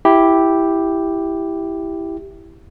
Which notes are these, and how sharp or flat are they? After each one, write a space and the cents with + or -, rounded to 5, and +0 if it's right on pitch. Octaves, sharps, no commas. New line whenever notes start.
E4 +0 G4 +0